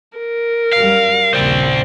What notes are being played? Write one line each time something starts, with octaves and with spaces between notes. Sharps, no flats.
A#4
F#2 G3 F5
A#1 D#2 C#3 C5 D5 G5